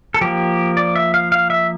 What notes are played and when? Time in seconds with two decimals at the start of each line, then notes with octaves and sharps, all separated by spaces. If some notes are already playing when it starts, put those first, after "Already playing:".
0.14 A4
0.21 F3 A#3 G4
0.77 D5
0.95 E5
1.14 F5
1.32 F5
1.50 E5